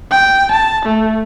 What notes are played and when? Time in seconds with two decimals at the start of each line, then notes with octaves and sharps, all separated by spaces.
0.11 G5
0.52 A5
0.86 A3